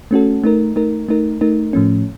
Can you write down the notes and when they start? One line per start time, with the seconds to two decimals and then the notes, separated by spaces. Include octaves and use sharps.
0.11 A3 C#4 F#4 A4
0.44 A3 D#4 A#4
0.76 A3 D#4 A#4
1.09 A3 D#4 A#4
1.41 A3 D#4 A#4
1.73 A2 F3 A3 C#4